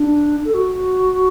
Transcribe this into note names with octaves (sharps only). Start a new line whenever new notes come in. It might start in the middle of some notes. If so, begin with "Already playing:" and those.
Already playing: D4
A4
F#4